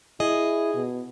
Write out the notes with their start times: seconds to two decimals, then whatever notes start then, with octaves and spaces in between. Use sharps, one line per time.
0.20 E4 G#4 D#5
0.74 B2